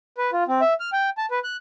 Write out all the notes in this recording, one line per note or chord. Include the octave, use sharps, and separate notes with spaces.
B4
F4
C4
E5
F6
G5
A5
B4
F#6